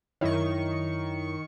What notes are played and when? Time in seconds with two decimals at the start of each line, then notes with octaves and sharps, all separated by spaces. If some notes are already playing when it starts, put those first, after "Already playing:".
0.21 F#2 D#3 E4 C#5 C#6